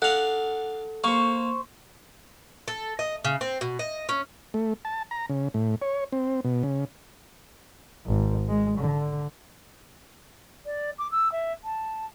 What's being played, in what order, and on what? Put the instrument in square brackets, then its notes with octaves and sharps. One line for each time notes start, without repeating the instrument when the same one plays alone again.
[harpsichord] D4 F5 [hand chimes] A4 [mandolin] F#5
[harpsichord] A#3 [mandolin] C5 C#6
[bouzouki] A4
D#5
C#3
C4
B2
D#5
C#4
[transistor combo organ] A3
A5
A#5
C#3
A2
C#5
C4
B2
C#3
[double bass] G#1
G#3
D3
[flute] D5
D6
E6
E5
A5